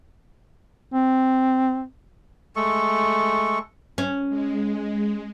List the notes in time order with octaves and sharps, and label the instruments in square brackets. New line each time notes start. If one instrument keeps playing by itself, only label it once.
[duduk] C4
[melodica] G#3 A3 A4 C#6
[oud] C#4
[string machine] G#3